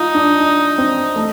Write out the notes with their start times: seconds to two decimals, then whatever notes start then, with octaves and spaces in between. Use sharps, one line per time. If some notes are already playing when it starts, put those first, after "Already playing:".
Already playing: D#4 F4
0.14 D4
0.40 D4
0.78 C4
1.16 A3